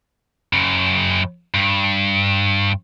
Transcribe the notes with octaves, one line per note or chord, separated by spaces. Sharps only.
F#2 C#3
G2